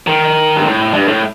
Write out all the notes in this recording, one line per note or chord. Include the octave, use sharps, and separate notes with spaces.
D#3
G2
A2
G2
A2